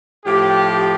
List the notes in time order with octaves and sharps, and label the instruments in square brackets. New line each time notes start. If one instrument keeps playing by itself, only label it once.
[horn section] A2 F3 G4